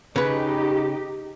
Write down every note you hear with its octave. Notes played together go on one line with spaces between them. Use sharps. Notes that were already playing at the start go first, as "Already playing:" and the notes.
C#3 D#4 G4 B4